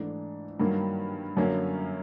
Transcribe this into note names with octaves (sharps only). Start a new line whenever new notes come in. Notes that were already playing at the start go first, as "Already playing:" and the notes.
Already playing: G#2 E3 A3 D4
G2 D#3 F#3 A#3
F#2 D3 F#3 A#3 C#4